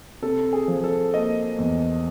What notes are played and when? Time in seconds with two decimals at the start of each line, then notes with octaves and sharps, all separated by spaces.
0.22 C3 A4
0.53 G#4
0.68 F3
0.84 A4
1.13 A#3 D#5
1.58 E2